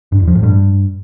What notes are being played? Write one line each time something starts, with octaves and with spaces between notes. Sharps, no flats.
G2
E2
F3
A2
G2